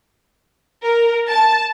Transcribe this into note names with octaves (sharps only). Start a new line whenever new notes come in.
A#4
A5